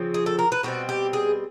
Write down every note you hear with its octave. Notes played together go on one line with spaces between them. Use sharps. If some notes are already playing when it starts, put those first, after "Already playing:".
Already playing: C#3 F3 C4
G#4
A4
A#4
B4
B2 G3 C4 F#4
G4
G#4